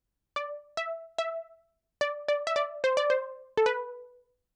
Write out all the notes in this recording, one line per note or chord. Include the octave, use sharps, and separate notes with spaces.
D5
E5
E5
D5
D5
E5
D5
C5
D5
C5
A4
B4